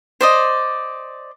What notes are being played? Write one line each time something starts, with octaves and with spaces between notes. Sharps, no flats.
C5 D5 D#5